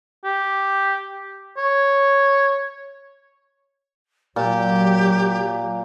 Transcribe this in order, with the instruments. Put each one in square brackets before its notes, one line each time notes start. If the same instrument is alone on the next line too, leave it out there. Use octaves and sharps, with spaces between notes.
[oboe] G4
C#5
[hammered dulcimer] A#2 [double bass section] F#3 [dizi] G4